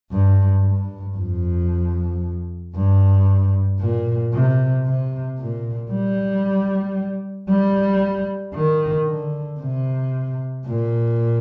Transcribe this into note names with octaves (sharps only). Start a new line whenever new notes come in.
G2
G2
F2
G2
A#2
C3
C3
A#2
G3
G3
D#3
D3
C3
A#2